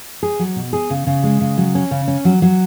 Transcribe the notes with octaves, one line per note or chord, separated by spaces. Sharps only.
G#4
F#3
B2
G#4
C#3
C#3
G#3
C#3
F#3
C#4
C#3
C#4
F#3
F#3